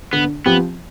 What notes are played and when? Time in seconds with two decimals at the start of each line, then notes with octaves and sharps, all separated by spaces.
0.13 D3 B3
0.46 F3 B3 C4 G4